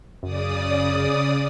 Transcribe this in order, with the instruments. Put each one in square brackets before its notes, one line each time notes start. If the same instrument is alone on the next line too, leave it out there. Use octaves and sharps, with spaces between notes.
[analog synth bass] F#2 [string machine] C#3 D5 D#6